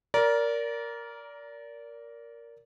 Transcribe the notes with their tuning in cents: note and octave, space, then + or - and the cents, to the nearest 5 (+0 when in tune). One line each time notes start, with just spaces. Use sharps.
A#4 +0 D5 -25 A#5 +20